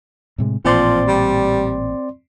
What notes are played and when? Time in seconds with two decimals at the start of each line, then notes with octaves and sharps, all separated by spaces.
0.38 A2 C3 G#3
0.65 A1 A#2 F3 C4 D5 C6
1.07 G3